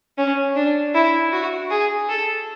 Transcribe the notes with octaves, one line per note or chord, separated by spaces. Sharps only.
C#4
D4
E4
F#4
G#4
A4